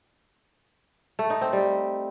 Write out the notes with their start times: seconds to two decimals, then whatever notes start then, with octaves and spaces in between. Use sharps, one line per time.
1.19 A3
1.30 D#4
1.41 C4
1.53 G3